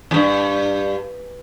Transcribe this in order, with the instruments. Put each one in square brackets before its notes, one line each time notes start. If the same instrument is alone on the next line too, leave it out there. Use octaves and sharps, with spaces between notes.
[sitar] E2 G2